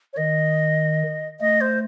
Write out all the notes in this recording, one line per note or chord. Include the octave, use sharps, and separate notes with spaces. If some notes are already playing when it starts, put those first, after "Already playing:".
C#5
D#3 D#5
A3 D#5
C5